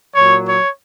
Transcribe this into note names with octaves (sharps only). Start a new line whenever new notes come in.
A#2 F#3 C#5
C#5